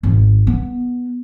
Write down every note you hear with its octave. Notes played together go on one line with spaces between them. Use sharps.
G#1
B3